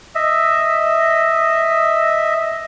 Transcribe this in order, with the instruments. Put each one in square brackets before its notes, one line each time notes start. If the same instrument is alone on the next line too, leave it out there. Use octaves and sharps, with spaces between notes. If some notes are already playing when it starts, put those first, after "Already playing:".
[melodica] D#5 E5